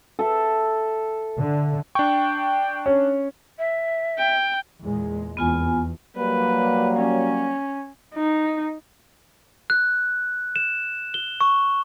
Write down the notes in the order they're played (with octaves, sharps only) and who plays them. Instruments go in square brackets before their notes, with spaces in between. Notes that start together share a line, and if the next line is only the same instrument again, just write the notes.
[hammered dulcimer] A4 E5
[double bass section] D3
[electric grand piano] D4 C#6 [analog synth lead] G5
[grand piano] C#4
[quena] E5
[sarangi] G5
[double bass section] E2 A#2 G#3
[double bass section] F1 E2 [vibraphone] B3 F4 G#5
[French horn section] F#3 G3 A#3 [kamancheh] B4
[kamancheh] C#4
[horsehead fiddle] D#4
[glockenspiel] F#6
E7
G7
C#6